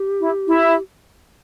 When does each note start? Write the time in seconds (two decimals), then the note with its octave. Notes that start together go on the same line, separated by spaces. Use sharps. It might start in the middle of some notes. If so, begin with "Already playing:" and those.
Already playing: G4
0.20 E4
0.47 E4